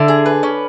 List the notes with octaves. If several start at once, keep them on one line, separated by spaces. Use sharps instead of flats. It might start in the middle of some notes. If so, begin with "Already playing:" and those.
Already playing: D3 E4
G#4
B4
C#4